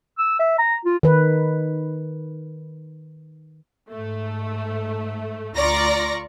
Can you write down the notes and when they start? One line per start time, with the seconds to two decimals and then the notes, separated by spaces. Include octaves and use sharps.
0.18 E6
0.39 E5
0.59 A#5
0.85 F4
1.03 D#3 B4
3.89 G#2 A3
5.56 D2 F4 D5 A#5 C#6 A#6